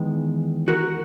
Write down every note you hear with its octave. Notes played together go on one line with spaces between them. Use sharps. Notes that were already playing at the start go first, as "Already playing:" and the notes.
Already playing: E2 D#3 G#3 B3
F#4 A#4